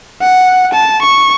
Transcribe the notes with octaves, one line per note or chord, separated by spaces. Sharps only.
F#5
A5
C#6